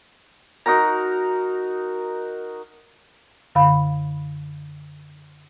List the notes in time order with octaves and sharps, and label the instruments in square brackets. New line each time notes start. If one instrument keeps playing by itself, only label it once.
[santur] D#4 F#4 A#4 A#5
[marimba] F#2 D3 F5 B5